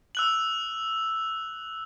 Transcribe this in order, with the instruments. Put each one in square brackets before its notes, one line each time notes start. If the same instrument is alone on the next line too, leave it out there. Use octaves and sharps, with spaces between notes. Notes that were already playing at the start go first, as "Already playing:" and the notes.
[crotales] E6 F#6 F#7